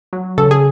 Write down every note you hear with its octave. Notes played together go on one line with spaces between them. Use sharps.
F#3
C#3 A4
G#4